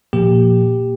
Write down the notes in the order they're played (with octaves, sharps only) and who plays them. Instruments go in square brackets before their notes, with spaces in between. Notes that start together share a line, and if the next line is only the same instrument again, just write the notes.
[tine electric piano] A#2 F3 A#3 G4